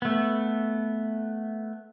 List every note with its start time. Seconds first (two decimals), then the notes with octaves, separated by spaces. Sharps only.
0.02 A3 B3